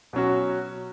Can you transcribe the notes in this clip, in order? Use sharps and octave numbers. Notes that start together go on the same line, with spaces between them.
B2 F#3 C#4 F#4